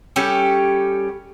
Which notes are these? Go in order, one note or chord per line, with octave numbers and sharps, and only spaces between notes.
G3 C#4 G4 A4